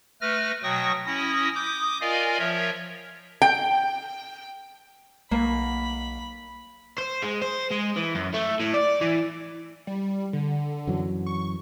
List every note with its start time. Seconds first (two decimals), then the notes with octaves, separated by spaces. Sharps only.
0.21 A3 B4 F6 A#6
0.63 B2 F#3 G5 C#6 D#6 A#6
1.06 C#4 E4 D#6 A#6
1.55 D6 D#6 G6
2.01 F4 A#4 D5 D#5 F5 G#5
2.39 F3 A#4 C#5 E5
3.42 G5
5.31 B1 A#3 B5
6.98 C5
7.22 G#3
7.42 C5
7.71 G#3
7.96 E3
8.15 F#2
8.34 A3
8.60 A2
8.74 D5
9.01 E3
9.87 G3
10.33 D3
10.87 F#2 E3 F#3
11.26 C#6